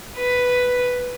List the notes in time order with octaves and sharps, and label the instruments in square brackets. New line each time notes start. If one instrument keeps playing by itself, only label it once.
[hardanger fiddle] B4